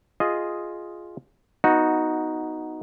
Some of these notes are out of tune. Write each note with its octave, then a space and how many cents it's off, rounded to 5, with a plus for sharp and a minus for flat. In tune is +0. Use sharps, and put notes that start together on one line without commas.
F4 +0 G#4 +0 D#5 +0
B3 +0 D#4 +5 F#4 -5